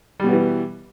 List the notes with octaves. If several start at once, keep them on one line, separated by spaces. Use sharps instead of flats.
B2 E3 G3 B3